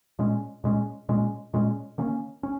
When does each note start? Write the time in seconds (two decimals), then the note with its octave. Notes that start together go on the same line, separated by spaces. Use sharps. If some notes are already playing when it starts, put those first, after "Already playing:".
0.19 A#2 G#3 C#4
0.64 A#2 G#3 C#4
1.09 A#2 G#3 C#4
1.53 A#2 G#3 C#4
1.98 D#3 A#3 C#4
2.43 C#4